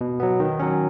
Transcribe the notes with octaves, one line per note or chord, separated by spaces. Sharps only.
B2
F#3 B3
D#3
F#3 C#4